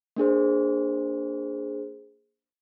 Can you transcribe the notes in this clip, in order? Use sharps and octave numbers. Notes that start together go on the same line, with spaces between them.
A#3 D4 G#4 C5